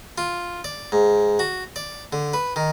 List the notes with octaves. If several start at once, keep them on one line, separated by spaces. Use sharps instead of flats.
F4
D5
G#2
F#4
D5
D3
B4
D#3